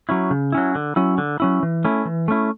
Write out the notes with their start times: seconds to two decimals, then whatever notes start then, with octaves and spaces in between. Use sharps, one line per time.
0.09 F#3 C#4 E4
0.31 C#3
0.52 F#3 C#4 E4
0.75 D3
0.96 F#3 C#4 E4
1.18 D3
1.40 F#3 C#4 E4
1.63 E3
1.85 A3 C#4 E4
2.05 E3
2.28 A3 C#4 E4